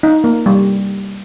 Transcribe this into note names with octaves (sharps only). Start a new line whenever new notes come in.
D#4
A#3
G3